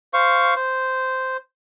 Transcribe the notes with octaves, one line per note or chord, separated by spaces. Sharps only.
C5 F5 C#6
C5